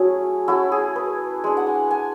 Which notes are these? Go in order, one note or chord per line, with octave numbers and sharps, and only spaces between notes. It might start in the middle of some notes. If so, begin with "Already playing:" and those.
Already playing: F#3 A3 C#4 E4 G#4
A3 C#4 E4 F#4
G#4
B4
G#3 D4
F#5
G#5
G#5